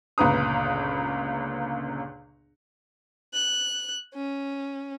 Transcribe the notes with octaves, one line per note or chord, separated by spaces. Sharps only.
G1 C#2 A#2 B4 A#5 D#6
F#6
C#4